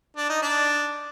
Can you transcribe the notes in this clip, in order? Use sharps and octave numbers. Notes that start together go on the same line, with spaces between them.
D4
D#4
D4